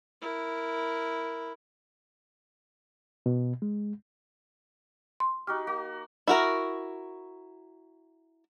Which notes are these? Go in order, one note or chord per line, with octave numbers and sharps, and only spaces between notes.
E4 A#4
B2
G#3
C6
D#4 F#4 G4 F6
A#3 F#4
E4 F#4 A#4